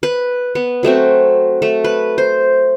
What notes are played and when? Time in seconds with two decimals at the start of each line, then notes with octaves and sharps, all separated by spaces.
0.03 B4
0.55 B3
0.83 F#3 A3 C4 F#4
1.62 A3
1.84 B4
2.18 C5